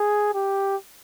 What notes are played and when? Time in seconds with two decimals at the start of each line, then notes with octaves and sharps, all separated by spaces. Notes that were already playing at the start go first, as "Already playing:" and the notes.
Already playing: G#4
0.34 G4